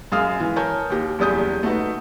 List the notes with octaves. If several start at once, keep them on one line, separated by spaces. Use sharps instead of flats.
F#2 G#3 F5 D#6 F6
E3
A#4 C#5 G#5 A5 G6
D#2 G4
F#1 E2 G3 D#6 G6
A3 D#4 F#4 B4